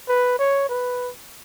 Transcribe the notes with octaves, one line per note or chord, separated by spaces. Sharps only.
B4
C#5
B4